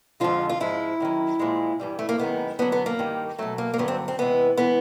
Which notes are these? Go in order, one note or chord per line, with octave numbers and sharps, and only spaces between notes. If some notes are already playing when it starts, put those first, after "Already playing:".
F2 D3 F3 G#3 F4
F4
G#2 F3 G#3 E4
F#2 D#3 F#3
A#2 F3 G#3
G2 E3 G3
A3
A#3
F#2 D#3 G#3 B3
F#2 D3 F#3 B3
B3
A#3
G2 D#3 G3
B2 F#3 A3
A#3
A#3
G2 D3 F#3 B3
C4
C4
E2 C3 E3 G#3 B3
E3 G#3 B3